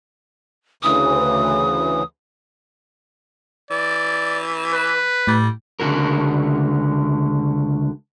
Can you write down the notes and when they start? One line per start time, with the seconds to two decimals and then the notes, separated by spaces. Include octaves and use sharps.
0.83 D2 C#3 E3 D#6
3.71 E3 D5
4.73 B4
5.27 A2 G3
5.80 C#2 D3 F#4 A#4